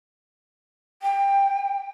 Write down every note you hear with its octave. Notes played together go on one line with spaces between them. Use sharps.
G5